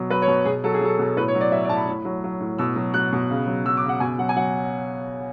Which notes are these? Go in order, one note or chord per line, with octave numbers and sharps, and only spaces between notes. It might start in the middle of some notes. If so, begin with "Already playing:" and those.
Already playing: B2 F#3
F#3 B4
C#5
B2
B2 G#4
F#3 A4
G#4
F#3 A4
B2
A2 B4
C#5
F#3
D5
F#3 E5
D5
A2 A5
B5
A2
F#3
F#3
A2
B2 E6
F#3
F#3 F#6
B2
C#3
F#3
F#3 E6
D6
C#3
F#5
B2 G#5
F#3 F#5
G#5
F#3 F#5